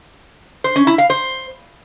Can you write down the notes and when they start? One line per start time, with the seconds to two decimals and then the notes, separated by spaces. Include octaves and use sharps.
0.64 C5
0.76 C#4
0.87 E4
0.98 F5
1.10 C5